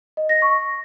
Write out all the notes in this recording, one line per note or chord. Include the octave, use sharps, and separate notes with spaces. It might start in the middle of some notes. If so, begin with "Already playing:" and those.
D#5
A#6
C#6